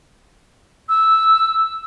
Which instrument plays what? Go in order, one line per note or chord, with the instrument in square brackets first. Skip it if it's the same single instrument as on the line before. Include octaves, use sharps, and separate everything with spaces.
[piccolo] E6